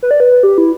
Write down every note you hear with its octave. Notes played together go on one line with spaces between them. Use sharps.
B4
D5
B4
G4
E4